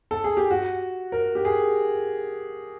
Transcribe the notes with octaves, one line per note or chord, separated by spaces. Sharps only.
A4
G#4
G4
F#4
A#4
G4
G#4